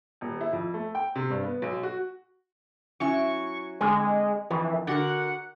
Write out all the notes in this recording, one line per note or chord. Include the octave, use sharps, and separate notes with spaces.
D#1
E4
F2
A3
G5
C3
G2
B3
B1
F#4
F#3 C#4 E4 C#6
D3 G#3 C4 G#5
F2 E3
D3 F#4 A#4 F#5